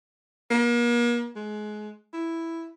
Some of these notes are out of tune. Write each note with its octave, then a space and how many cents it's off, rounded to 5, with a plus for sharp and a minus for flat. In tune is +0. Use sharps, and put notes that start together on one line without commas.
A#3 +40
G#3 +25
E4 +5